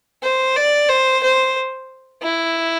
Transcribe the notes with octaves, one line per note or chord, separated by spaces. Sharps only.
C5
D5
C5
C5
E4